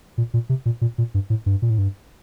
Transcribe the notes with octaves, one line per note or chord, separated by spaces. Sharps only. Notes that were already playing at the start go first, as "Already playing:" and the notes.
A#2
A#2
C3
A#2
A#2
A#2
G2
A2
G2
A#2
A2
G2